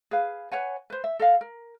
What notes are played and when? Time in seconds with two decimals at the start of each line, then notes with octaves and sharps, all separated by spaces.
0.11 G#4 B4 F5
0.51 B4 C#5 F#5 G#5
0.90 B4 C5
1.04 E5
1.19 A4 D#5 F5 F#5
1.41 A#4